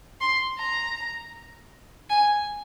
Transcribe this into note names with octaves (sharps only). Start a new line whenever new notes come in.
C6
A#5
G#5